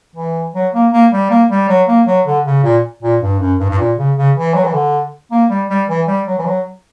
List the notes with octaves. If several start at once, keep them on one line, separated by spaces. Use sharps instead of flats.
E3
F#3
A#3
A#3
G3
A#3
G3
F#3
A#3
F#3
D3
C#3
A#2
A#2
G2
F#2
G2
G2
A#2
C#3
C#3
E3
F#3
E3
D3
A#3
G3
G3
E3
G3
F#3
E3
F#3